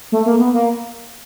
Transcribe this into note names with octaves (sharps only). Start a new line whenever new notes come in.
A3
A#3
B3
A#3